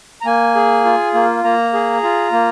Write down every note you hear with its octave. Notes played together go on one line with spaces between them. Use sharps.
A#5
A#3 G#5
G#4
F4
A#3
A#3 A#5
G#4
F4
A#3